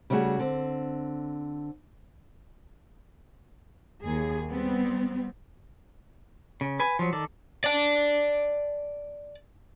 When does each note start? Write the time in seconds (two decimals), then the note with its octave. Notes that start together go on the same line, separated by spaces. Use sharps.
0.10 C#3 G3 A3 F4 F#4 G#4
0.39 D3 C4
4.03 D#2 G#4
4.48 G3 B3 C4
6.61 C#3
6.80 B4 G#5
6.99 F3 F#3
7.13 D#3 A4 D5
7.64 D5 A5